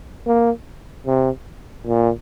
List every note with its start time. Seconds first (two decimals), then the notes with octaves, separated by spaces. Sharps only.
0.27 A#3
1.06 C3
1.86 A#2